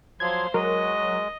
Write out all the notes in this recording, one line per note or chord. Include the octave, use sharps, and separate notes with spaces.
F3 F#3 C5 F5 C6 G#6
F#3 G#3 A#4 D#5